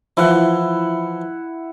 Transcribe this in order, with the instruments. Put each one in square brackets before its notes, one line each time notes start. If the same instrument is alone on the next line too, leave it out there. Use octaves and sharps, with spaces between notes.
[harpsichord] E3 F3 [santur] E4 F#5